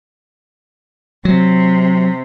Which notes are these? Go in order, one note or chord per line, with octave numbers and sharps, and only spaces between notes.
C3 F#3